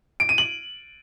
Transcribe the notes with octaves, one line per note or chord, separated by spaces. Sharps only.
D7
D#7
F#7